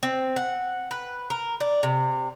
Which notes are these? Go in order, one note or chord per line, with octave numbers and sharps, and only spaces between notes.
C4
F#5
B4
A#4
D4
C3